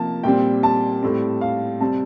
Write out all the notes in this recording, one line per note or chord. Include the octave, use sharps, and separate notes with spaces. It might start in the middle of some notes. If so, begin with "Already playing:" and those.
Already playing: C3 F3 A#3 A5
A#2 G3 C4 G5
A5
A2 G3 C4
F5
C3 G3 C4 A5